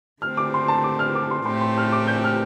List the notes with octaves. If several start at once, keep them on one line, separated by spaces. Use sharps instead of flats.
D3 A3 C4 F6
D6
C6
A5
D6
F6
D6
C6
A2 A3 C4 G4 C6
C6
F6
D6
G6
F6